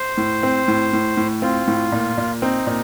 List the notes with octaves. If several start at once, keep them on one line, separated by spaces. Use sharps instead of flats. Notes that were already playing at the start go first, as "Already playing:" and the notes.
Already playing: C5
A2
C4
A2
A2
A2
C4 F4
A2
A#2
A#2
C4 D#4
A#2